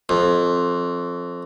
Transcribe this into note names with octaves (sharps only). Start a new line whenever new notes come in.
F2